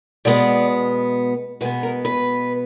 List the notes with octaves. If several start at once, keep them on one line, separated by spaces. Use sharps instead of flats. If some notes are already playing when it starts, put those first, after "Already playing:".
B2 G#3 B3 D5
B2 G#3 B3 B4
A#4
B4